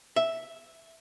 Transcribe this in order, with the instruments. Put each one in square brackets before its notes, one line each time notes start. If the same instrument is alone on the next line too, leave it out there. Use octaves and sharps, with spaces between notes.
[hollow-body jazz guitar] E5